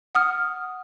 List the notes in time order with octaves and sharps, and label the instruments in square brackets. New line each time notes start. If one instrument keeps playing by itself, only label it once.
[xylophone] F#5 D#6 F6